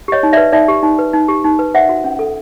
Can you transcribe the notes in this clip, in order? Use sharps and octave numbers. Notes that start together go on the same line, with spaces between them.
G4 C#5 D#5
D#4
B4 D5 E5
D#4 D5 E5
G4
D#4
B4
D#4
G4
D#4
B4
C5 E5 F#5
F#4
C#4
A4